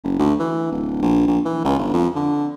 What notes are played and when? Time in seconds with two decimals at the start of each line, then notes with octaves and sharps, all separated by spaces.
0.04 F#1
0.19 D2
0.39 E3
0.72 D1
1.02 A#1
1.28 A#1
1.45 E3
1.65 C#2
1.79 G1
1.94 F2
2.16 D3